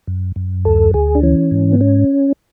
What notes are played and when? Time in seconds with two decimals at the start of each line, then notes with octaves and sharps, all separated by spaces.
0.07 F#2
0.36 F#2
0.65 D2 A4
0.94 D2 G#4
1.15 D4
1.23 E3 C#4
1.51 G#2
1.72 B3
1.81 C#4